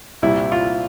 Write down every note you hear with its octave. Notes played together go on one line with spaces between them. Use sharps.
C2 A#2 G3 E4
F4